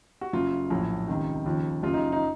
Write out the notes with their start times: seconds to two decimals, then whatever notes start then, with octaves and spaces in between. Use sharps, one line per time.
0.21 F#4
0.33 F#1 F#2 C#3 F#3 F4
0.70 A#1 A2 F#3
1.08 C#2 C3 D#3
1.46 D#2 C#3 F3
1.83 F#1 F#2 C#3 F4
1.93 D#4
2.12 D#4